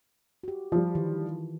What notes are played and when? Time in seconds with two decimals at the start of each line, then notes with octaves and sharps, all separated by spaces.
0.43 F#4 G4
0.72 F3 G3 F4
0.95 D#3 E3